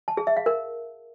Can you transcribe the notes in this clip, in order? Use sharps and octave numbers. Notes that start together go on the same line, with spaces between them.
A5
G#4
E5
F5
A#4